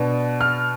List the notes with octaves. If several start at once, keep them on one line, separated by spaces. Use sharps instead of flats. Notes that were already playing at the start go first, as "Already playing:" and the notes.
Already playing: B2 B3 D4
F6